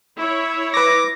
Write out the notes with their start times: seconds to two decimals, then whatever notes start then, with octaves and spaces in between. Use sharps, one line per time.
0.18 E4 C#5
0.74 B4 D6 A#6